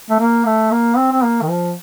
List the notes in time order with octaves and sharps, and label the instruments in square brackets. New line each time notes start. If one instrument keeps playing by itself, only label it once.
[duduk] A3
A#3
A3
A#3
C4
C4
A#3
D#3
F3